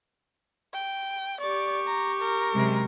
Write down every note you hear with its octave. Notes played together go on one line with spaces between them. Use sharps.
G5
G4 D5 C#6
A#5
A#4
F#2 C3 G#3